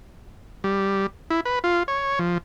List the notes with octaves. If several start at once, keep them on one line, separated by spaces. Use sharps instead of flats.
G3
E4
B4
F4
C#5
F3